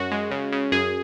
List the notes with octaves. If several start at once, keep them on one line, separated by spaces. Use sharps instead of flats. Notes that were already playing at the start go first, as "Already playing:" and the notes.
Already playing: F#2 F#4
G#3
C#3
C#3
F#2 G#4